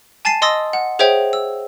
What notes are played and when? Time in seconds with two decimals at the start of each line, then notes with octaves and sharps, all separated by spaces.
0.25 G#5 A5 A6 C7 D#7
0.42 D#5 C6 D#6 E6 A6 A#6
0.73 F#5
0.99 G#4 C5 C#5 E5 G5
1.33 E6